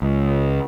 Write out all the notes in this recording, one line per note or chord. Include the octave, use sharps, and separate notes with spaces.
C#2